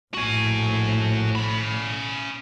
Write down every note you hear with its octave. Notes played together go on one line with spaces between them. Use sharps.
A#1 A2 F#4 G#5
C#4 B5